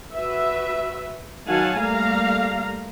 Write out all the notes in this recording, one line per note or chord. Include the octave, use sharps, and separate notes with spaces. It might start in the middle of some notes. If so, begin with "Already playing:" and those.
F#4 B4 E5
D#3 F#3 F5 F#5 G#5 A5
G3 A3 A#3 F5 A#5